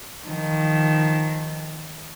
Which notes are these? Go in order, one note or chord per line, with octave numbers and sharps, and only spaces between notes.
D#3 F3